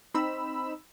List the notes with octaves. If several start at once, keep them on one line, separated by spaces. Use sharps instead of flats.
C4 D#4 B5 E6